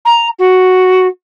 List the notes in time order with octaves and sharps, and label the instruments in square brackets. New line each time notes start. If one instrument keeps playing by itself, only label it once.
[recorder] A#5
F#4